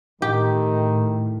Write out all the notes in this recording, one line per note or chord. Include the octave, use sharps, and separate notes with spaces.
A2 D#3 G4